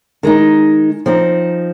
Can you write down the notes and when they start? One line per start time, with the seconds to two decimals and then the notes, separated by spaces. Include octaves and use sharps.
0.23 D#3 G#3 D#4
1.06 F3 C4 D#4